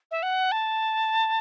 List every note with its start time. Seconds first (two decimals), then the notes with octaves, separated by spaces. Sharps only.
0.11 E5
0.23 F#5
0.52 A5